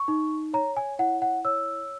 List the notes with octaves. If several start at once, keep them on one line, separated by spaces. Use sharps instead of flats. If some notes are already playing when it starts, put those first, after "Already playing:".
Already playing: C#6
D#4
C#5 A#5
G#5
E4 F#5
F#5
C#5 E6